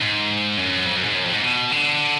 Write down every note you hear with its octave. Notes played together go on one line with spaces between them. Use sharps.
G#2
F#2
F2
F#2
G#2
F#2
F2
G#2
B2
D3